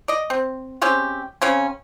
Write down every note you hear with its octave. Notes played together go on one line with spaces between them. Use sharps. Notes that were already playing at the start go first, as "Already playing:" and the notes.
D5 D#5
C4
G#3 C4 C#4 G4
C#3 C4 C#4